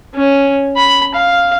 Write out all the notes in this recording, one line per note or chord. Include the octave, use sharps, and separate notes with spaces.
C#4
B5
F5